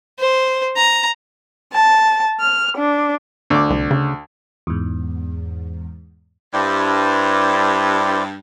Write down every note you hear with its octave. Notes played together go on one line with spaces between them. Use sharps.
C5
A#5
A5
F6
D4
D2 D6
C2
C#3
E2 G#2
G2 E4 C5 D5